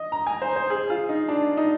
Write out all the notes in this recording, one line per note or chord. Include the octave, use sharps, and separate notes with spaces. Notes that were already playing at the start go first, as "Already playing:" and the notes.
Already playing: D#5
A#5
G#5
C5
C5
G#4
F4
D#4
D4
D#4